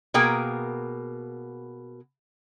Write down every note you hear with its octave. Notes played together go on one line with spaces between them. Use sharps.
B2 A#3 G#4 A#4 G5